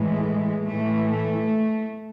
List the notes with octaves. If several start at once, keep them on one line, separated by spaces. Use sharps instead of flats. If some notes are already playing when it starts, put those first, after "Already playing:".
Already playing: A2 E3 G#3
A2 E3 A3
A3